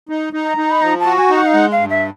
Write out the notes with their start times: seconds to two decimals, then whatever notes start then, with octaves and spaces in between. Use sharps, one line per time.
0.09 D#4
0.33 D#4
0.46 A#5
0.57 D#4
0.71 B5
0.82 F3 A#5
1.00 A5
1.06 F#4
1.18 G#5
1.30 D#4
1.35 F#5
1.47 F5
1.54 G#3 F#5
1.72 F5
1.78 G2
1.90 E5